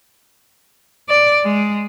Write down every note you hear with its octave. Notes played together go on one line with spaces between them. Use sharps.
D5
G#3